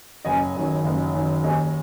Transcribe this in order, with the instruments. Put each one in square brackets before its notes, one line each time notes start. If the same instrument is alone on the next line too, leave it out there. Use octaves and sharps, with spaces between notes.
[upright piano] F#1 D#5 G#5
F#2 D#3
F#1
F#2 D#3
D#2 D#5 G#5